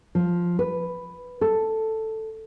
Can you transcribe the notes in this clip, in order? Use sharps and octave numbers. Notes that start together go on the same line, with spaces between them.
F3
B4
A4